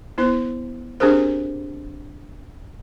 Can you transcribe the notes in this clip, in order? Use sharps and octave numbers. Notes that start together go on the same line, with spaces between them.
B3 E4 C5
C4 D4 G4 G#4 A#4 C5